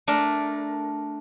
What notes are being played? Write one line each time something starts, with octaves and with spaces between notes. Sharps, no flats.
A3 D4 A#4